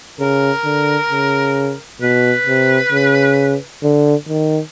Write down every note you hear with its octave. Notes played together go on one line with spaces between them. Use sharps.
C#3 A#4
D3
C#3
B2 B4
C3
C#3
D3
D#3